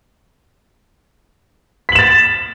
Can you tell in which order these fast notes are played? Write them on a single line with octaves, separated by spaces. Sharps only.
B6 F#7 E7 A6